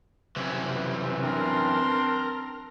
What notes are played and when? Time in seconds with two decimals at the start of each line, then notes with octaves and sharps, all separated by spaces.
0.36 F#2 C3 E3
1.22 C4 D4 A#4 C6